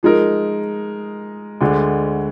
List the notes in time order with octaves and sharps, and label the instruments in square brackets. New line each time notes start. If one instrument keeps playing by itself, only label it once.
[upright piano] F3 G#3 D#4 A#4
D2 D3 G#3